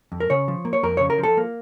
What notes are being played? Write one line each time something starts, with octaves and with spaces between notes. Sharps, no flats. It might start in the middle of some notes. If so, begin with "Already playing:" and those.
F2
A#4
C#3 C#5
F3
A#3
C#5
F2 A#4
C#3 C#5
A#4
F3
A4
A#3